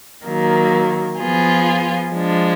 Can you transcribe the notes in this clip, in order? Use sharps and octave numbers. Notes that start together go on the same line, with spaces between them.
D#3 F#3 A#3
F3 B3 F4 G#4
F3 G#3 D4